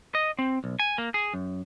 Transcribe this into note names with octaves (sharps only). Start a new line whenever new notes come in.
D#5
C4
B1
G#5
A#3
G#4
F#2